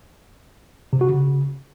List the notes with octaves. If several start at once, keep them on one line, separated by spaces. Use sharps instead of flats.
C3
F#4
C#3